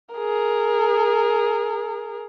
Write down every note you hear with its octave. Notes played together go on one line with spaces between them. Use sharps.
G#4 A#4